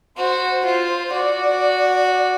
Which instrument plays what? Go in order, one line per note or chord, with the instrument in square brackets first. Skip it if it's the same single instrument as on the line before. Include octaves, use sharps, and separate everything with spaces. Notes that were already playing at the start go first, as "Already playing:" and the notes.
[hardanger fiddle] F#4 [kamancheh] C5
[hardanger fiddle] F4 [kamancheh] C5
[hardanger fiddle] F#4 [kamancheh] D5
[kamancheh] D5